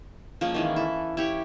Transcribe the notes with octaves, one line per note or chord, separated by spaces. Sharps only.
F3 G#3 A#3 C#4
D#3 E3 G#3
E4 A4
E4 G4 C#5